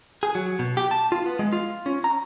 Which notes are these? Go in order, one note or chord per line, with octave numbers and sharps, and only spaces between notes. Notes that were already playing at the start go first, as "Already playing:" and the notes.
G#4
F#3
B2
G4
A5
F4
B3
G#3
F4
C#4
A#5